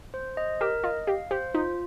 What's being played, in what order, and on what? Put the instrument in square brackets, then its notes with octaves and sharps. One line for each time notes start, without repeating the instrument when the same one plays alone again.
[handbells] C5
D#5
[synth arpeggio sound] G4 [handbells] A#4
[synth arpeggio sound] F4 [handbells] D#5
[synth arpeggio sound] G4 [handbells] F5
[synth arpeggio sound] G4 [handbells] C5
[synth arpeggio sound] D#4 [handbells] F4